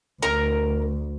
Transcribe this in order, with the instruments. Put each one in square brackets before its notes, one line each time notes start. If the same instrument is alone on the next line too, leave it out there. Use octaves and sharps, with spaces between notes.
[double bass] D2 [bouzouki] A#4 A#5